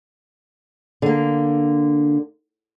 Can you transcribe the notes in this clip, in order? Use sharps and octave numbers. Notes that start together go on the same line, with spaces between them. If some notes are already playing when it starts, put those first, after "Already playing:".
D3 A#3